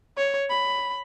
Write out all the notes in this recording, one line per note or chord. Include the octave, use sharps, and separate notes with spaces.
C#5
B5